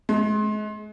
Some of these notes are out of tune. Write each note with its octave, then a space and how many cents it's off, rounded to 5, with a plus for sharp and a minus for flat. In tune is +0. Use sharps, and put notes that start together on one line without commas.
G#3 +35